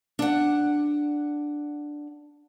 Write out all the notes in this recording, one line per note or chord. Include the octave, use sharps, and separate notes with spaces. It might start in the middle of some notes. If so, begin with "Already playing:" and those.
D4 F#5